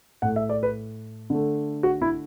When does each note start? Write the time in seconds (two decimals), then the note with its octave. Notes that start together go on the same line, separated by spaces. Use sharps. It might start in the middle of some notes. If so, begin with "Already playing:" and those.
0.22 A2 A3 F#5
0.36 E5
0.49 D5
0.63 B4
1.30 D3 A3
1.83 F#4
2.02 E4